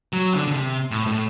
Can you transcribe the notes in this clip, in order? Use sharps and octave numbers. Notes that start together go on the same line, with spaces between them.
F#3
D3
D3
C3
A2
A2